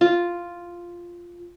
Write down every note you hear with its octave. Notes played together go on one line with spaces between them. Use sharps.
F4